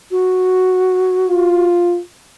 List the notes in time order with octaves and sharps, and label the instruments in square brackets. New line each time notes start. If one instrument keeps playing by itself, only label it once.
[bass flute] F#4
[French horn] F4